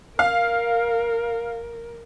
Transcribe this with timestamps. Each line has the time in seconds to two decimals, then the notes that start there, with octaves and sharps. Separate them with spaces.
0.19 A#4 F5